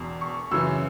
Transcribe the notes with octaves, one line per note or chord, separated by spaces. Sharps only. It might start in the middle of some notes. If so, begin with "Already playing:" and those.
Already playing: E1 E2 B2
C#6
F#2 C#3 E3 E6